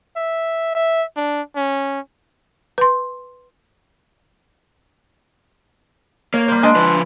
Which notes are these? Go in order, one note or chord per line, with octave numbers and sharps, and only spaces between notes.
E5
E5
D4
C#4
B4 C6
A#3 C#5
G3 C5
G#3 D4 G#5
F3 B4